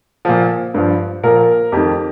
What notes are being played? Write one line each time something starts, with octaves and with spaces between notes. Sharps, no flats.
A#2 F3
G2 F3
A#2 F3 A#4
F2 D#3 G4